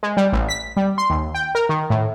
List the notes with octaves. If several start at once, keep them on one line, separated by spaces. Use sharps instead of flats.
G#3
G3
A1
B6
G3
C6
D#2
G5
A#4
D#3
A2